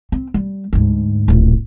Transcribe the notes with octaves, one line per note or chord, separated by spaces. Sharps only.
C4
G3
D2 G#2
D1 A#1